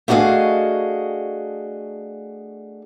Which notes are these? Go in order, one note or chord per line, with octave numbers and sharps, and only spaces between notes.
A3 D4 F#4 G#4 D#5 F5